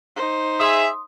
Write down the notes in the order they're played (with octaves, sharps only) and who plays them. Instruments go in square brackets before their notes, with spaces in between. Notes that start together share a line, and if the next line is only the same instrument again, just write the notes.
[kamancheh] D#4 C5
[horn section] G#4 E5 [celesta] C6 D#6